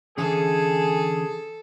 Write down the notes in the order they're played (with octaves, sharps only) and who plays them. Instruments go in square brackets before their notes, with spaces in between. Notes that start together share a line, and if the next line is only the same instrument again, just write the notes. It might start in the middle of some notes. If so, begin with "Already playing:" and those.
[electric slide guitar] D3 E3 C#4 [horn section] G#4 [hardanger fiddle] A4